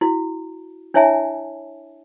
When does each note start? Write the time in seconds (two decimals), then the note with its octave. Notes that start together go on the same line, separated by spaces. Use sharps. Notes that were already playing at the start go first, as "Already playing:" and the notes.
0.01 E4 F#4
0.94 D4 E4 C#5 E5 G#5 A5